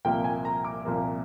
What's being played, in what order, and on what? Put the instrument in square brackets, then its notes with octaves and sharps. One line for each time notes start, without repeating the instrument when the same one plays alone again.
[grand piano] C2 A#2 F3 A#3 G5
G#5
A#5
D6
C2 A#2 F3 A#3